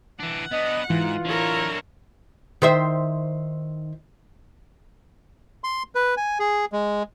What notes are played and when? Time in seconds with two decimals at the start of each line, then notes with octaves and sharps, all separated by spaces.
0.20 E3 D4 F#5
0.52 B3 D4 D#5
0.90 G#2 E3 F4
1.25 D3 E4 A#4 C#5
2.62 D#3 C5 E5
5.64 C6
5.95 B4
6.17 G#5
6.40 G#4
6.72 G#3